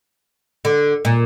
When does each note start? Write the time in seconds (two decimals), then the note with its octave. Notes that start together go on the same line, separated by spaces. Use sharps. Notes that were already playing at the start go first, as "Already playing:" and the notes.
0.65 D3
1.05 A#2